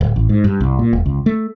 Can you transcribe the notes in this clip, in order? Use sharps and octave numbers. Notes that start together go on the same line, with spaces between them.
D1
A1
G#2
G2
C2
A#2
E1
C#2
A3